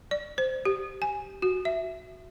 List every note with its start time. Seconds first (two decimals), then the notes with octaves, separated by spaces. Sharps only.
0.11 D5
0.38 C5
0.65 G4
1.02 G#5
1.42 F#4
1.65 E5